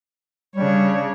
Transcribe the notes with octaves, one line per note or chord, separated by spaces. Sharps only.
C#3 G3 D4 C#5